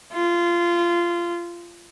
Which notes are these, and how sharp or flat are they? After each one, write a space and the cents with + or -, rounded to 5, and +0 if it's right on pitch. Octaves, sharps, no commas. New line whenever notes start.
F4 -20